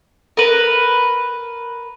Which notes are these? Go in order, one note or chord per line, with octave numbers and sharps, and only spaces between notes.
A#4 B4